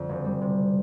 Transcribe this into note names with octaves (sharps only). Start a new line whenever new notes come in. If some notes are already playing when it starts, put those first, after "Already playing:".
Already playing: F2 D3
F#1
G3
C3